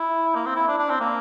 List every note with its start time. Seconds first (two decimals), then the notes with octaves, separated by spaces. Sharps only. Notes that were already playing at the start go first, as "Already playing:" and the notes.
Already playing: E4
0.35 A#3
0.46 C4
0.56 E4
0.67 D4
0.78 D4
0.90 C4
1.01 A#3